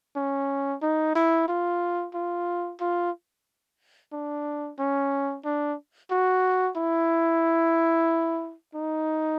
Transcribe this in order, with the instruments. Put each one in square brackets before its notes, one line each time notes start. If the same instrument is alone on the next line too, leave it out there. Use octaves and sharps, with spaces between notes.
[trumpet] C#4
D#4
E4
F4
F4
F4
D4
C#4
D4
F#4
E4
D#4